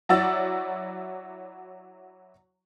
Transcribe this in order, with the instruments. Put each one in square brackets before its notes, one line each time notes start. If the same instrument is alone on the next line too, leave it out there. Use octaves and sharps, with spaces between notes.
[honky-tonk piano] F#3 E4 F#4 D5 E6 A6